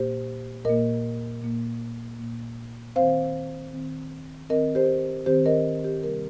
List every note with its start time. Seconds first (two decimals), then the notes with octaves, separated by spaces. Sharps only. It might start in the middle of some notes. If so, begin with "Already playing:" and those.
Already playing: A#2 A#3 G4 C5
0.65 A#2 A#3 A#4 D#5
1.42 A#2 A#3
2.19 A#2 A#3
2.96 D#3 C4 C5 F5
3.73 D#3 C4
4.50 D#3 C4 A#4 D#5
4.75 G4 C5
5.26 D#3 C4 G4 C5
5.46 A#4 D#5
5.84 G4
6.03 C3 G3 A#3 A#4